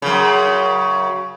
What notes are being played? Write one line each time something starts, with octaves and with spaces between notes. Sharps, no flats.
F#2 C#3